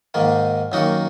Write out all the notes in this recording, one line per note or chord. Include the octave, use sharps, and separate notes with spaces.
G#2 D#3 A#3
F#2 D#3 A#3 D#4 F#4